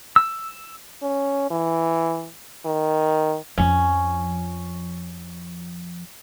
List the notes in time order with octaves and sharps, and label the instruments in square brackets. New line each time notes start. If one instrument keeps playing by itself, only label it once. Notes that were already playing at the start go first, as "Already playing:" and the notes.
[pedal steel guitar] E6
[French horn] C#4
E3
D#3
[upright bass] F2 F3 [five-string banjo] C#4